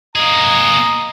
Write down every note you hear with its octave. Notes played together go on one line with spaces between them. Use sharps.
A#3 G#4 D#5 A#5